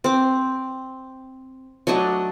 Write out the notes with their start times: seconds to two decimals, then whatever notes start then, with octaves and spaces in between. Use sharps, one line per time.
0.04 C4 D6
1.87 F#3 A3 D4 D#5